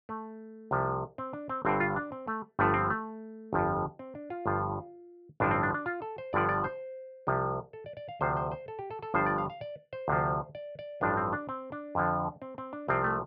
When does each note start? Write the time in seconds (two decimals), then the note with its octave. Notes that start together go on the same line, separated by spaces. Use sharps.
0.09 A3
0.71 C2 C3 F3
1.18 C4
1.33 D4
1.49 C4
1.65 G1 G2 D3 C4
1.80 F4
1.96 D4
2.12 C4
2.28 A3
2.59 G1 G2 D3 F3 A3
2.74 C4
2.90 A3
3.53 G1 F2 F3
3.99 C4
4.15 D4
4.30 F4
4.46 G1 G2 F3
5.40 A1 G2 D3 F3 D4
5.51 C4
5.63 D4
5.74 D4
5.86 F4
6.02 A4
6.18 C5
6.33 G1 G2 D3 F3 D5
6.49 D5
6.64 C5
7.27 C2 C3 F3
7.73 A4
7.86 D5
7.97 D5
8.09 F5
8.21 D2 C3 F3 C5
8.37 C5
8.51 C5
8.68 A4
8.79 G4
8.91 A4
9.03 A4
9.14 G1 G2 F3 C5
9.26 D5
9.38 F5
9.50 F5
9.61 D5
9.93 C5
10.08 D2 C3 F3
10.55 D5
10.79 D5
11.01 A1 G2 F3 D4
11.17 C4
11.33 D4
11.49 C4
11.72 D4
11.95 F2 D3 F3
12.42 C4
12.58 C4
12.73 D4
12.88 C2 C3 F3 C4
13.04 A3